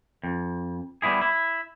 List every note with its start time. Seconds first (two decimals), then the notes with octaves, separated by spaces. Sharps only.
0.24 F2
1.02 G3 B3 E4 G#4
1.21 E4